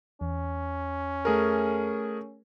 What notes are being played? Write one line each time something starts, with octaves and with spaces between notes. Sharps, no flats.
E2 C#4
A3 G#4 A#4